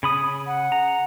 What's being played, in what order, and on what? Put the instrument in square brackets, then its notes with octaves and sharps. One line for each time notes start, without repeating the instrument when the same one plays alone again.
[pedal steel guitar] C#3 B5 D#6
[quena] F#5
[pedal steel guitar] A#5